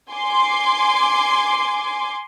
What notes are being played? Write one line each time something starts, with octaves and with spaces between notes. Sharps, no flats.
G#5 C6 D6